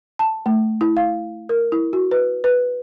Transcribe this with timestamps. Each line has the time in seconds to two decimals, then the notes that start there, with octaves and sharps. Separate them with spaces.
0.19 A5
0.46 A3
0.81 E4
0.97 F5
1.49 A#4
1.72 E4
1.93 F#4
2.11 B4
2.44 B4